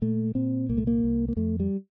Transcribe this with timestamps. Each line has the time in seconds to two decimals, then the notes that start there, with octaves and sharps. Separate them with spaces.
0.02 A#2 A3
0.35 A#2 C4
0.69 C2 A#3
0.78 A3
0.87 A#3
1.04 C2
1.28 A#3
1.36 F2 A3
1.60 G3